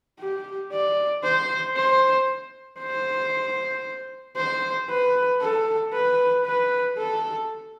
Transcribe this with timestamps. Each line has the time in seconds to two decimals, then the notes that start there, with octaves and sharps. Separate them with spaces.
0.20 G4
0.72 D5
1.24 C5
1.76 C5
2.80 C5
4.36 C5
4.89 B4
5.41 A4
5.93 B4
6.45 B4
6.97 A4